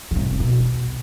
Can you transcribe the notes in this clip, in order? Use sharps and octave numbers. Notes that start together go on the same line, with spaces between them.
D3
C3
B2